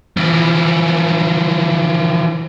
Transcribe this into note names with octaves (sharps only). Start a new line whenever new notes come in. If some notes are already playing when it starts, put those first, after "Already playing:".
E3 F3